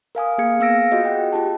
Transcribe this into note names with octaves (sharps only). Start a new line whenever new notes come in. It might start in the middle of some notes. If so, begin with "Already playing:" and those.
A#4 F5 G#5 D#6
A#3 G#4 F5 G#6 C#7
B3 F5 E6 A#6 D7
F4 F#4 G#4 D#5
F#5 G5
F4 G4 A5